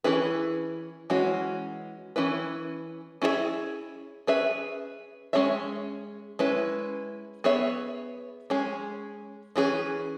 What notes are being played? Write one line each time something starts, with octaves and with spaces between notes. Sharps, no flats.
E3 C#4 E4 G#4 B4
E3 G#3 C#4 F#4
E3 C#4 E4 B4
C#4 E4 G#4 B4 E5
C#4 G#4 B4 E5
G#3 C#4 G#4 C#5 E5
G#3 C#4 E4 B4
B3 G#4 C#5 E5
G#3 C#4 G#4
E3 C#4 G#4 B4